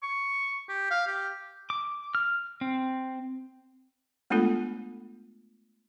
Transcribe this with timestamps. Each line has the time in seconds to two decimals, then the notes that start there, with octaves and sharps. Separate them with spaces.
0.03 C#6
0.69 G4
0.91 F5
1.07 G4
1.70 D6
2.15 F6
2.61 C4
4.30 G#3 A3 B3 D4 F4 A4